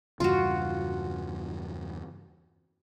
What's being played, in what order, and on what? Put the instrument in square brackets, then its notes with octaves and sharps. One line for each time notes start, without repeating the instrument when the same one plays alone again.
[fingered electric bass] E2 G2 C#3 [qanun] F4 F#4